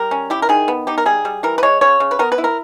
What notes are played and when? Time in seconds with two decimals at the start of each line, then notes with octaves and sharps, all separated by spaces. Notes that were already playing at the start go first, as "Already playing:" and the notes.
Already playing: G3 A#4
0.11 C#4
0.30 E4 G4
0.42 A#4
0.49 D#3 G#4
0.68 B3
0.87 D#4 G4
0.98 A#4
1.06 G3 G#4
1.25 G3
1.43 E3 A#4
1.58 B4
1.63 G#3 C#5
1.81 C#3 C#5
2.00 C#3
2.11 B4
2.19 B3 A#4
2.32 B4
2.38 E4
2.44 A#4